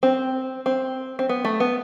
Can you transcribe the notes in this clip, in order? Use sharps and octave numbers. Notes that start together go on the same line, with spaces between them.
C4
C4
C4
B3
A3
B3